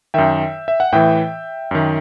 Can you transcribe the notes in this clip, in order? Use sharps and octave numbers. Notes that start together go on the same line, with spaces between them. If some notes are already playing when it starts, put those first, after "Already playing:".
F#2 D#3 E5 G5
E5
F#5
A2 E3 E5 G5
F#2 D#3